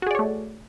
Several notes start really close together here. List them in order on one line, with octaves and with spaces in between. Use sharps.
F#4 G#4 D5 C#5 A3